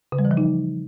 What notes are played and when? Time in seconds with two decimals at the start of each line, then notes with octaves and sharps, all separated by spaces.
0.12 C#3
0.19 G3
0.25 E3
0.31 F3
0.37 D#4